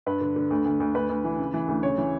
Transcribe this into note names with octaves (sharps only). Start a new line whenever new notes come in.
G2 B4
D3
D3
D2
D2
D2
D2 B4
D2
E3
C#3
E3
D2
C#3 C#5
E3